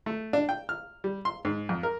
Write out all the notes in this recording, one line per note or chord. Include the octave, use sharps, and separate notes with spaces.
A3
D4
G5
F6
G3
C6
G#2
F2
A#4